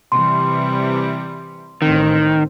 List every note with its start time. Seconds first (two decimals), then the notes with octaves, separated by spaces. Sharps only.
0.12 C3 E3 G3 C6
1.82 A1 D#3 C4